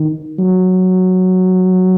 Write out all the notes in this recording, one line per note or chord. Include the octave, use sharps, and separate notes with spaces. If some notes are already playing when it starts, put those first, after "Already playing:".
Already playing: D#3
F#3